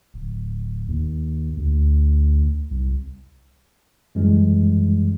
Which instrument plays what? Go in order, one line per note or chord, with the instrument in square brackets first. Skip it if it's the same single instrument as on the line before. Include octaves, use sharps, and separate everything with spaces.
[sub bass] D1
D#2
D2
C2
[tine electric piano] F#2 E3 G3 G#3